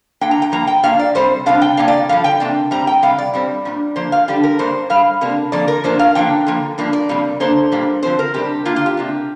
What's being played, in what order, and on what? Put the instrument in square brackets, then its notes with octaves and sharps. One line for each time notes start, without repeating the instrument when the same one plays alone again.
[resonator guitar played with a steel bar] D3 A#3 D4 G5
A#5
G5
G2 F3 A#3 A#5
G5
A#2 A#3 D4 F5
D5
C3 G3 C4 C5
C3 G3 D4 F5
G5
C3 A#3 D4 F5
D5
G2 D3 F3 F5
G5
C3 A#3 D4
G2 G3 C4 A#5
G5
C3 G3 F5
D5
G2 G3 C4
A#2 G3 D4
D3 F3 A#3 C5
F5
D3 G3 D4 G4
A#4
G2 G3 A#3 D4 C5
G2 G3 F5
C3 A#3 D4
F2 D3 F3 A#3 D5
A#4
A#2 F3 A#3 D4 C5
F5
D3 F3 A#3 D4 G5
D3 F3 A#3
G2 F3 A#3 D4
D5
F2 C3 G3 A#3
D3 A#3 D4 C5
A#2 G3 A#3 D4
D3 F3 C4 C5
A#4
C3 G3 D4 G4
D3 A#3 D4 F4
F4
G4
C3 A#3 D4